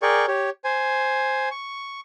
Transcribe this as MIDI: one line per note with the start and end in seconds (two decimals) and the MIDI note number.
0.02 0.26 68
0.02 0.26 70
0.02 0.26 74
0.02 0.26 79
0.02 0.26 85
0.28 0.50 67
0.28 0.50 73
0.64 1.49 72
0.64 1.49 80
1.51 2.00 85